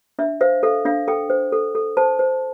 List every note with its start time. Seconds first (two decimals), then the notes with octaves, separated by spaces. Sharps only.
0.19 D4 E5
0.41 C5 F5
0.63 A4 F5
0.85 D4 F5
1.08 A4 G5
1.30 C5
1.52 A4
1.75 A4
1.97 C5 A5
2.19 C5